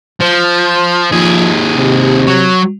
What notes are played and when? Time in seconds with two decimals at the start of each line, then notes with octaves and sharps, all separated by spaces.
0.20 F3
1.12 D#2 F3 G#4
1.76 C3
2.27 F#3